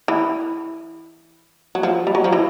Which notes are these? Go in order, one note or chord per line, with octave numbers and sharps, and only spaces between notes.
E3
F#3
F3
G3
F#3
F3
E3